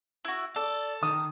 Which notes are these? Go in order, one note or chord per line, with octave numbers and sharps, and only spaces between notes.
E4 F#4
A4 D5
D#3 D#6